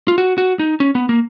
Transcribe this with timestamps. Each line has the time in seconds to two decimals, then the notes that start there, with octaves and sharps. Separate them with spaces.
0.08 F4
0.18 F#4
0.38 F#4
0.59 D#4
0.80 C#4
0.95 B3
1.09 A#3